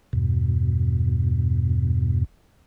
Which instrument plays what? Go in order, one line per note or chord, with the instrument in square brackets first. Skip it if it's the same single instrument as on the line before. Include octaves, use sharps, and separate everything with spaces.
[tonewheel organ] E2 G2 B2